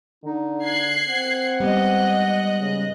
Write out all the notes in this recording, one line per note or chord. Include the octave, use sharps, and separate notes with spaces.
D3 D#4
F#6 G#6 C7
C4 F#5
G#2 G3 B3 D#5 F#6
C#3